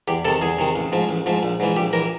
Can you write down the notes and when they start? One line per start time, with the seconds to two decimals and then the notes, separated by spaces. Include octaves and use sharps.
0.08 E2 G4
0.25 C3 A4
0.28 D#3
0.41 E2 G#4
0.59 C3 D#3
0.76 A1
0.92 G#2 F3
1.09 A1
1.26 G#2 F3
1.43 A#1
1.60 G#2 E3
1.76 A#1 G4
1.93 E3 A#4